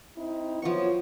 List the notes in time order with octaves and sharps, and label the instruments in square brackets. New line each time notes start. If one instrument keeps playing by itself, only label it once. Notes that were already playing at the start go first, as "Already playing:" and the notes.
[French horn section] C4 D#4 E4
[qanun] F3 C#6 [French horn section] F#3 B3 C#5